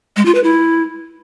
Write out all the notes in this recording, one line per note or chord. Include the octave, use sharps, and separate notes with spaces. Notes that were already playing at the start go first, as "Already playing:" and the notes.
G#3
F4
B4
E4